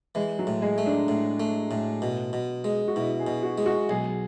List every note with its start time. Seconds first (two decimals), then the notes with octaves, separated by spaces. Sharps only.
0.15 E3 G#3
0.39 F#3
0.47 A2
0.62 G#3
0.78 A3
0.86 D4
1.08 A2
1.40 A3
1.71 A2
2.02 B2
2.33 B2
2.64 G#3
2.88 F#4
2.95 B2 E4
3.20 G#4
3.27 B2
3.43 F#4
3.58 G#3
3.66 F#4
3.89 B1 G#4